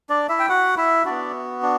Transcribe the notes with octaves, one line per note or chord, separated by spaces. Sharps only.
D4 D5
E4 E5
G5
F#4 F#5
E4 E5
B3 D4 F#4 D5
D4